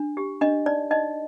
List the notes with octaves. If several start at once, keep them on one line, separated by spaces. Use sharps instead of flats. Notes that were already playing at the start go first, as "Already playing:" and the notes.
Already playing: D4
G4
D4 D#5
D#4 D5
D#4 D#5